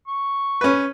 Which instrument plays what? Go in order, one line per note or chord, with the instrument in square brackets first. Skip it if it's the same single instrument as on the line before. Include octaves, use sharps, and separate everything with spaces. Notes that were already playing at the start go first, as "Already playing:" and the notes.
[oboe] C#6
[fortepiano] C#4 B4